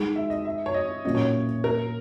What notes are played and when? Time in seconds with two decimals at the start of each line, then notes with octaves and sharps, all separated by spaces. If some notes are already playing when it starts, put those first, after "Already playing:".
Already playing: G#3 D#4 G#4
0.16 E5
0.30 D#5
0.45 E5
0.66 C#5
0.74 D#5
1.05 A#2 F#3 A#3 C#4 D#5
1.15 C#5
1.64 A#4